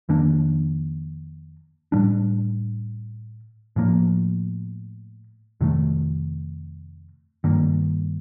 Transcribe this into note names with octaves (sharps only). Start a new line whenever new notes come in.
F2 D#3 A#3 D4
A2 G3 D4
A2 F3 A#3
F2 C3 D#3 A3
G2 D#3 A#3